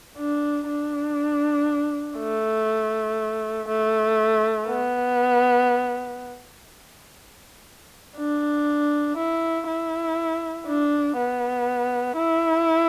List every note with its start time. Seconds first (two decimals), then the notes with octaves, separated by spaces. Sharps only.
0.18 D4
0.68 D4
2.18 A3
3.68 A3
4.68 B3
8.17 D4
9.17 E4
9.67 E4
10.67 D4
11.17 B3
12.17 E4